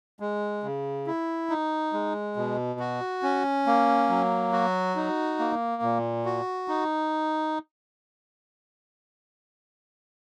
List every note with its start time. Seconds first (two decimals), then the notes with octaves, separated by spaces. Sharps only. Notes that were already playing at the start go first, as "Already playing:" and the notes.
0.20 G#3
0.63 C#3
1.06 E4
1.50 D#4
1.93 G#3
2.36 B2
2.80 F#4
3.23 C#4
3.66 A#3
4.09 F#3
4.52 F#4
4.96 D#4
5.39 A#3
5.82 A#2
6.25 F#4
6.68 D#4